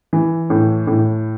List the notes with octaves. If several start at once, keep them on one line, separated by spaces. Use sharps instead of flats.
E3
A2
A2